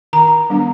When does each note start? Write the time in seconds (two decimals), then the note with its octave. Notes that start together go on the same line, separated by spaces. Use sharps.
0.13 D#3 A#5
0.50 G3 B3 D4